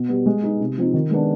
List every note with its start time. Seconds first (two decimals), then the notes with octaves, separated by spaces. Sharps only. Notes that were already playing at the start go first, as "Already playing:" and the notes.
Already playing: B2
0.09 G3 B3
0.26 G#3
0.43 B3 D#4
0.60 C3
0.78 F3 C4 D#4
0.94 D#3
1.11 G#3 B3 D4